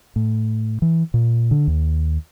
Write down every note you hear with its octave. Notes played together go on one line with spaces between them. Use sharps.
A2
E3
A#2
D3
D#2